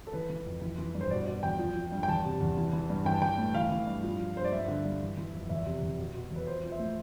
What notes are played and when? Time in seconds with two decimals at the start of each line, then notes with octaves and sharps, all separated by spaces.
0.07 A4
0.13 E3 B4
0.29 E3
0.46 F2
0.61 E3
0.78 E3
0.95 G2
1.01 C5
1.10 B2 D5
1.27 B2 D5
1.43 E2 G5
1.59 F3
1.76 F3
1.92 G2
2.03 G5
2.08 E2 A5
2.24 C3
2.40 E2
2.57 E3
2.73 E3
2.90 G2
3.05 E3 G5
3.14 A5
3.22 E3 G5
3.38 A2
3.54 E3 F5
3.71 E3
3.87 G2
4.03 F3
4.20 F3
4.36 G2 C5
4.45 D5
4.52 G2 E5
4.68 D3
4.85 G2
5.01 E3
5.17 E3
5.34 F2
5.49 E2 E5
5.66 C3
5.82 E2
5.98 B2
6.14 B2
6.31 E2 B4
6.47 F3 C5
6.64 F3
6.72 E5
6.79 A2